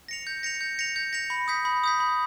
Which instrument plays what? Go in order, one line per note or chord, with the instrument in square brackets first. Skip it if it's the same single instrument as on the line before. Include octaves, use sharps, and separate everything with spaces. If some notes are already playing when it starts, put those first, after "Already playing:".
[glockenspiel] A#6 C#7 F7
G6
A#6 C#7 F7
G6
A#6 C#7 F7
G6
A#6 C#7 F7
B5
D#6 G6 B6
B5
D#6 G6 B6
B5